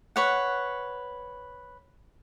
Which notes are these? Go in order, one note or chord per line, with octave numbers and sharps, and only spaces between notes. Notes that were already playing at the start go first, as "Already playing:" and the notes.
B4 C#5 F#5